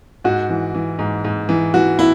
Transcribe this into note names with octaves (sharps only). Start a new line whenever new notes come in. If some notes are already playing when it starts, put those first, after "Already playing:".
G#2 F#4
E3
E3
G#2
G#2
E3
E3 F#4
E4